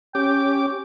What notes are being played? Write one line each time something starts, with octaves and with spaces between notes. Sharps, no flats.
C#4 G4 G5 D6